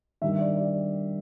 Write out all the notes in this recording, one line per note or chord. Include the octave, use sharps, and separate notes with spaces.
G2 D#3 E5
D5
D5